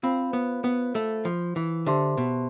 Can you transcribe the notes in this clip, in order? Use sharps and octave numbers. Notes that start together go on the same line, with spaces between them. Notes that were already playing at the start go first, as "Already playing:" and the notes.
C4 F4 C5 F5 B5
B3
B3
A3
F3
E3
D3 G4 C5 E5 A5 C6
B2